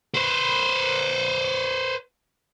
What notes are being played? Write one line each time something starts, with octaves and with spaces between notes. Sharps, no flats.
B4 C5